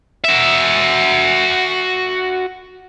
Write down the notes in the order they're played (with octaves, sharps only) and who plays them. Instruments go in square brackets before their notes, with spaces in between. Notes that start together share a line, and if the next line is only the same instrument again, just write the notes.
[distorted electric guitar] F#4 E5